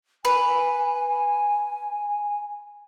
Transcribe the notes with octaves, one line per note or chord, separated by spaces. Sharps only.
B4 G#5